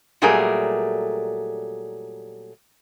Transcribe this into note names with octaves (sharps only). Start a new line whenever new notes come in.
A#2 F#3 G3 A3 G#4 A#4